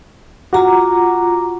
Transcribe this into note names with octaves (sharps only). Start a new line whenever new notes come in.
F4 F#4 A#5 D6